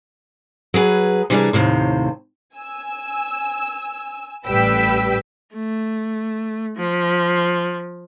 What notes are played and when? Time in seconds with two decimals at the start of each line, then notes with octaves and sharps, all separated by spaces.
0.74 F#3 G#4 B4
1.30 C3 E3 G3 D4 G#4 A#4
1.53 D#2 A2 C3 C5
2.57 G#5 E6
4.46 A1 G3 B4 G5 E6 B6
5.54 A3
6.77 F3